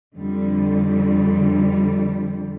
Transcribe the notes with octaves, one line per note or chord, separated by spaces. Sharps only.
F2 D3 G3